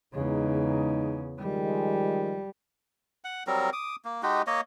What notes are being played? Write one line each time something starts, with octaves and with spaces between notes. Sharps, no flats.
E2 C#3 G#3 D#4
D#3 F3 G3 G#3
F#5
F#3 G3 C4 A#4
D6 D#6
A#3
G#3 D#4 F#4 G4
A#3 C#5 D#5